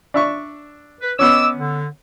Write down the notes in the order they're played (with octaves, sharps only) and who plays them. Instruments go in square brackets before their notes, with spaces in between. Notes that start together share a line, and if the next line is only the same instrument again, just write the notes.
[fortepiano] D4 E5 C#6
[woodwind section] B4
[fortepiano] B3 C#4 [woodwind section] D#5 D6 E6
[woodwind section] D3